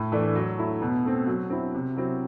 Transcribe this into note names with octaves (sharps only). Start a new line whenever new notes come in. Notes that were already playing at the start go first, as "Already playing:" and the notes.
Already playing: A2
E3 A3 D4
F#3
A3 E4
B2
A3 C4
F#3
C4 E4
C3
F#3 C4 E4